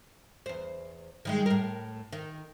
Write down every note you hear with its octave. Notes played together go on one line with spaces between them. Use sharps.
E2 C5
D#3 G3 G#3
A2 A#4
D#3